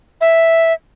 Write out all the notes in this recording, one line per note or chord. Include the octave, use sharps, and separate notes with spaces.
E5